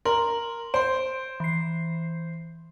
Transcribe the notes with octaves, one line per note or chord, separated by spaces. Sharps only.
A#4 C6 F#7
C5 C6 D7
E3 C7